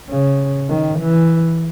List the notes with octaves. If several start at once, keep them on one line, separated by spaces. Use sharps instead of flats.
C#3
D#3
E3